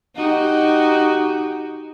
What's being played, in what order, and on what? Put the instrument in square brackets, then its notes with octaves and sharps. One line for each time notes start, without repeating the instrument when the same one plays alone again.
[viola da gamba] D#4 F#4 G4